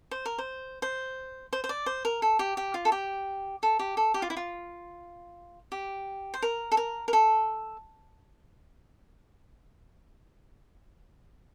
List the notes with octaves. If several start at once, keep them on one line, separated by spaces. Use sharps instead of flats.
C5
A#4
C5
C5
C5
C5
D5
C5
A#4
A4
G4
G4
F4
A4
G4
A4
G4
A4
G4
F4
E4
F4
G4
C5
A#4
A4
A#4
A#4
A4